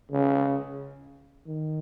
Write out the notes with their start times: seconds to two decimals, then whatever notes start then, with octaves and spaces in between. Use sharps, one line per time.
0.12 C#3
1.47 D#3